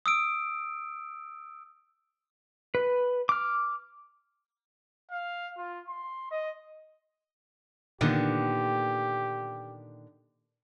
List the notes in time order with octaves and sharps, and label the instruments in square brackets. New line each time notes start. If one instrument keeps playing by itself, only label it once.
[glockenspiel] D#6 E6 D7
[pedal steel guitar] B4
D6 F6
[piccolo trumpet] F5
F4
C6
D#5
[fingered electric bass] A#2 A#3 [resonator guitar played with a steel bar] D3 D#3 B3 [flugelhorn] G4